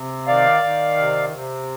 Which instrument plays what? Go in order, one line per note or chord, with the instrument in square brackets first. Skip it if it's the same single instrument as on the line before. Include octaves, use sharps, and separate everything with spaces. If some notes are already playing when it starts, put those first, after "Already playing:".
Already playing: [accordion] C3
D#3 D5 F5
D#3
C3
C3